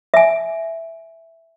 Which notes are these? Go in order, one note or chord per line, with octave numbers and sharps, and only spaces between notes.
E5 G#5